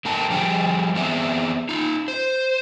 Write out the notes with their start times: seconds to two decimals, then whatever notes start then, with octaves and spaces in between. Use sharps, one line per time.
0.05 D3 A3 A#4 G5 A5
0.30 F3 G3 G#4 G5
0.95 E3 B3 C4 G#4 D5 E5
1.69 D#4 F4
2.08 C5